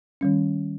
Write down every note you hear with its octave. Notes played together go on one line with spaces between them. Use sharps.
D#3 G3 C#4